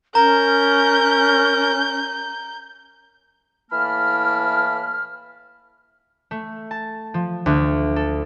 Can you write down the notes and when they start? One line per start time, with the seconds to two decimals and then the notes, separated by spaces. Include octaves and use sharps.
0.15 C#4 A#4 A#5 G6
3.71 A2 E3 A#3 A5 B5 F6
6.31 A3
6.71 A5
7.14 F3
7.46 D2
7.96 A4